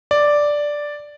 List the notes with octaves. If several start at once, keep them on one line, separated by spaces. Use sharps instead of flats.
D5